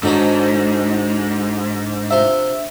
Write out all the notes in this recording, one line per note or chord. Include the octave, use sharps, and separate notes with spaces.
G#2 D#3 F#3 D4 D#4 A4 D#5
C3 F4 E5